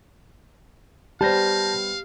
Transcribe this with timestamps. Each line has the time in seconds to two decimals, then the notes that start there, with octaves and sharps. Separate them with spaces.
1.21 G3 B3 G4 C5 F5 A5 G6 A#6